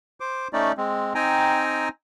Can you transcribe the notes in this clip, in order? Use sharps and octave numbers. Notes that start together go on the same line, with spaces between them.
C5 D6
A3 C#4 D#4 D5
G#3 C4
C4 D#4 G5 G#5 A#5